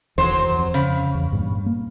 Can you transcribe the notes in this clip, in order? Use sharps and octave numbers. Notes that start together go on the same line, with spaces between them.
F1 D#2 E3 F#3 C5
F2
C#3
E2
G2 A#2 G3
A#3